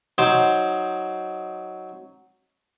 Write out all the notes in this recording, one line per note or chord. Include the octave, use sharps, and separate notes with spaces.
F#3 D#4 C5 C6 D6